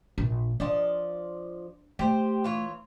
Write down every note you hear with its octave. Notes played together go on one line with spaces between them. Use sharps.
A#1 D4
F3 D4 D5 D#5
A3 G4 C5
E3 F4 C#5